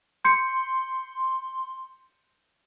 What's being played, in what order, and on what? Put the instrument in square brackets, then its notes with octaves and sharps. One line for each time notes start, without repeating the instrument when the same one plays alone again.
[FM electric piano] C6 [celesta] G6 C#7